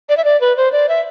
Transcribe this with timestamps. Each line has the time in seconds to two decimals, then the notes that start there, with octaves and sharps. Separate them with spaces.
0.09 D5
0.17 E5
0.25 D5
0.41 B4
0.57 C5
0.72 D5
0.89 E5